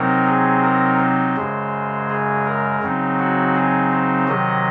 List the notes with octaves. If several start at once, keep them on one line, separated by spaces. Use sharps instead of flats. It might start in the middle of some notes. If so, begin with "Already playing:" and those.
Already playing: C3 F#3 C4 D#4 A#4
G#4
A#4
C5
F#2 C#3 G#3
G#4
A#4
C#3 F#3 C4 D#4
F#4
G#4
C5
C3 D#3 F#3 D#5